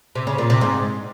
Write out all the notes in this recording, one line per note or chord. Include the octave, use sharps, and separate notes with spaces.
C3
C#3
A#2
C3
G#2